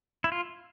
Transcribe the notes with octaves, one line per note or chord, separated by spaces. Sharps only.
E4
F4